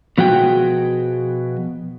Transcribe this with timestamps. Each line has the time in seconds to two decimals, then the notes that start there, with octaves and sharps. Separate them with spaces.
0.18 B2 F3 F#4 G#4 G5